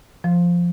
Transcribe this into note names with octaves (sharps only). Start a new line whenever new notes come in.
F3